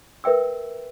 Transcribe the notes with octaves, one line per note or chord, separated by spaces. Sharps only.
A#4 B4 E5 G5 E6